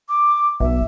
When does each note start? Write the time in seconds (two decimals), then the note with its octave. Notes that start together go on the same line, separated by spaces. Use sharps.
0.09 D6
0.60 B1 E5